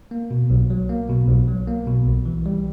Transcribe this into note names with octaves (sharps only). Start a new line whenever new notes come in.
A#3
B2
B1
F#3
A#3
B2
B1
F#3
A#3
B2
B1
E3
G3